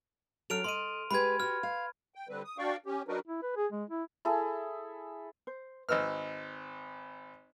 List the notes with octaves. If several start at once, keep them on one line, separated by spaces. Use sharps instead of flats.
F#3 C#4 A4 F6 D7 F7
A4 D#5 C6 D#7
G#3 G4 B4 B5 G#6
F#4 G4 F6
F5
G5
D3 G3 C4 B4
D#6
D4 F#4 D5 F5 G5 C#6
C#4 G4
F#3 D4 D#4 F#4 A#4 B4
E4
B4
G#4
G#3
E4
E4 G#4 A4
C5
G#1 B4 D#5 E6 F6